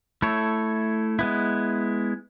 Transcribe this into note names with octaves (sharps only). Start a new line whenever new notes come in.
A3 E4 A4 C#5
G#3 B3 E4